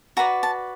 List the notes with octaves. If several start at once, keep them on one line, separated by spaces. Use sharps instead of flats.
F#4 B4 D5 A#5
A5